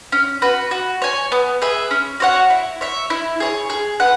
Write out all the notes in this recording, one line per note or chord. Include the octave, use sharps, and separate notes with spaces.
C#4
F#4 B4
F#4
C#5 G#5
B3
G#4 B4 E5
C#4
F#4 C#5 F#5
E4
C#5 E5
E4
G#4 C#5
G#4
B4 F#5